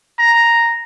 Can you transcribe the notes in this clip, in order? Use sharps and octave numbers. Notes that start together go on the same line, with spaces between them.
A#5